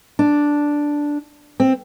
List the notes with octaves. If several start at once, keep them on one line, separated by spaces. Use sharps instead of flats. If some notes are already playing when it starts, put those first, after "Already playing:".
D4
C4